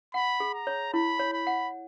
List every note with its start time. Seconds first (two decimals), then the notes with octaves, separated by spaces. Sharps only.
0.14 F#5 B5
0.40 G#4
0.54 A#5
0.67 C#5
0.94 E4 B5
1.19 C#5
1.33 B5
1.47 F#5